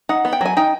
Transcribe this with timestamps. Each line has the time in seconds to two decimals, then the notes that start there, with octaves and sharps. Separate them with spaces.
0.09 D#4 F#5
0.25 B3
0.33 G5
0.41 F#3 G#5
0.57 D#4 G5